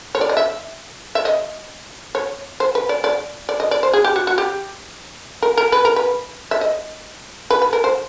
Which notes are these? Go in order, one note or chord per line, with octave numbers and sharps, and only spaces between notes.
C#5
D5
D#5
E5
E5
D#5
C#5
C5
B4
D5
D5
D5
D#5
D5
C5
G#4
G4
F#4
F#4
G4
A#4
A#4
B4
A#4
B4
E5
D#5
B4
B4
A#4
C5